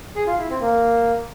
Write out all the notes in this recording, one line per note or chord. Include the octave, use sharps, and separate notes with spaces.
G#4
F4
E4
C4
A#3